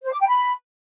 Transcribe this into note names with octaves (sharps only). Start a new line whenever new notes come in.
C5
D6
G5
B5